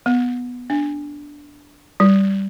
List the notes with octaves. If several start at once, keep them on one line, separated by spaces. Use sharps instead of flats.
B3
D4
G3